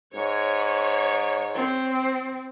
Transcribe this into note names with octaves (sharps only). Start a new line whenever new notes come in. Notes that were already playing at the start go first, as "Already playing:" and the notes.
G#2 C#5
C4